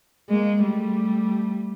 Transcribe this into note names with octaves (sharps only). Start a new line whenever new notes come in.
G#3 A#3
G3 A3